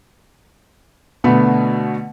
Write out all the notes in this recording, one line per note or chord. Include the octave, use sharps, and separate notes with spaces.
B2 D3 A3 B3